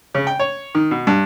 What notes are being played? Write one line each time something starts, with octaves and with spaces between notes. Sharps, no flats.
C#3
G5
C#5
D#3
B2
G2